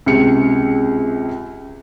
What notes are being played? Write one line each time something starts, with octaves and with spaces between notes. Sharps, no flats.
C#2 C3 C#7